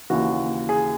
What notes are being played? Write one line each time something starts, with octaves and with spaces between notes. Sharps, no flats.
D#2 C#3 E3 F#4
G#4